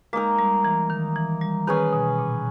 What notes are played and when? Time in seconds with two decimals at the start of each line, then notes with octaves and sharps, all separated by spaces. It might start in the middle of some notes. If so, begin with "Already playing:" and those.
0.13 G#3 A#3 D#4 A#4
0.39 G3
0.65 E3
0.90 D#3
1.16 E3
1.41 G3
1.67 D#3 C#4 G#4 B4
1.93 B2
2.19 A#2